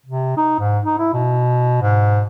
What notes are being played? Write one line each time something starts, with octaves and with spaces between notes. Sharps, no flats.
C3
D#4
G#2
D#4
E4
B2
G#2